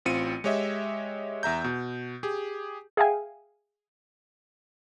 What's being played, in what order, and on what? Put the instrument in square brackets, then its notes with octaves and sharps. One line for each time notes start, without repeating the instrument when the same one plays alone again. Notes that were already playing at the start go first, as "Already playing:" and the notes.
[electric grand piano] A1 C4 F4 C#7 D#7
G#3 G4 C#5 D#5 E5
E2 E5 A#5 G6
B2
G4 G#4
[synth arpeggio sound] G#4 E5 F5 G5 G#5